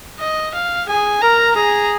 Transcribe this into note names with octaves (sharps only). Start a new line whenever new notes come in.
D#5
F5
G#4 G#5
A#4 A#5
G#4 A#5